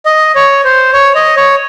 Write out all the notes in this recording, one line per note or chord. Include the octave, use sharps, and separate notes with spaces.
D#5
C#5
C5
C#5
D#5
C#5